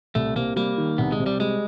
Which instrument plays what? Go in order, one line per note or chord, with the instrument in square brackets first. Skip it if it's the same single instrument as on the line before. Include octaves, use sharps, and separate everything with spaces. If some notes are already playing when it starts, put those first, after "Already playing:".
[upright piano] C2 [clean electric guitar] A3
[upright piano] C3 [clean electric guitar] A#3
[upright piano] G3 [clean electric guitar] A#3
[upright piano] D#3
[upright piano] C2 [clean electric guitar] B3
[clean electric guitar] G#3
[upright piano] C3
[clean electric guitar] G3
[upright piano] G3 [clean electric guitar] G#3